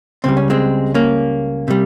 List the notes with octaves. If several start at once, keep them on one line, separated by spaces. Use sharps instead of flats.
C#2 C#3 G3 C4
C#4
G#3 C4
A#3 C#4
C3 G3